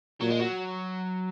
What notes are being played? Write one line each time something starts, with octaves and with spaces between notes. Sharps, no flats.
A#2 F#3
G#3
F#3